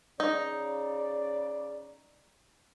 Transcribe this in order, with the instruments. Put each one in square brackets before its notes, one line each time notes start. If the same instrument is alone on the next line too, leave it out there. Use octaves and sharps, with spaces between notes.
[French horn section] C#3 D5 [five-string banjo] D#4